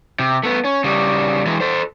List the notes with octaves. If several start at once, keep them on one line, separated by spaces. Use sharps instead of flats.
C3
A3 B3
C#4
C#3 G3
E3 G#3
A4 C5